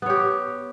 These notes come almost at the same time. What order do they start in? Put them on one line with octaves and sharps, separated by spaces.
B3 C#5 G4